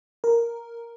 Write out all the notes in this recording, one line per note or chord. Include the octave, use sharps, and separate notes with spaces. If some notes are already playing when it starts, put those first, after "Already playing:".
A#4